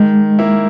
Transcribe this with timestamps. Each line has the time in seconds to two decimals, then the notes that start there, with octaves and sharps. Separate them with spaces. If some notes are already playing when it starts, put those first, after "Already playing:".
Already playing: D#3 G#3
0.39 A#3 E4